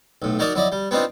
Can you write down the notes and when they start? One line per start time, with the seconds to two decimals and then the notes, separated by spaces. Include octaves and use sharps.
0.22 B1 A2
0.39 F#3 D#4 F#4 A#4 D5 D#5
0.55 F#3 E4 D5 D#5
0.72 G3
0.91 B3 C4 D4 D#4 F4